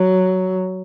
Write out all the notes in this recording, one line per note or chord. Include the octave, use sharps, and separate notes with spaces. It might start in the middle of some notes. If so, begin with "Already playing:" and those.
Already playing: F#3